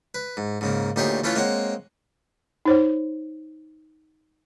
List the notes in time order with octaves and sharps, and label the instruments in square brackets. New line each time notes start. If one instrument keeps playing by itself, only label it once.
[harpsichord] B4
G#2
G#2 C#3 A#3
D2 A#2 D#4 G4 G#4 C#5
E3 A3 C#4 F4 B4 C#5
G#3 A#3 C4 C#5 F#5
[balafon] D#4 C5 C#5